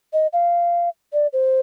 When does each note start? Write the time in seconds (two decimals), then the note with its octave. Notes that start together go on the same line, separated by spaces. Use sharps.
0.13 D#5
0.33 F5
1.13 D5
1.33 C5